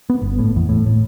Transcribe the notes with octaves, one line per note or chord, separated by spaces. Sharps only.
B3
G1
A2
E2
A2
A2